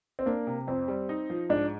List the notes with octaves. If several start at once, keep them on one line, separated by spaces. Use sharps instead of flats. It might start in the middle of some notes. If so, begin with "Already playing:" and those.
C4
A#3 D4
C3
F2 C4
G3
D#4
F3
G#2 D4